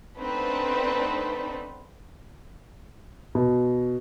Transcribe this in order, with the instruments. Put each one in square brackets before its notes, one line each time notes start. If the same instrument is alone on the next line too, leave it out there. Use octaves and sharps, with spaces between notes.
[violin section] A3 B3 C4 D4 D#4 B4
[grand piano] B2